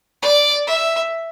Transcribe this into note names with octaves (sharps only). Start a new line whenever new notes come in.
D5
E5